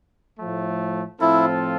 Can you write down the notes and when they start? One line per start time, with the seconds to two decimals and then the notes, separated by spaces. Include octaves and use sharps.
0.39 A2 F3 A3
1.20 A2 F3 C4 E4 F4 A4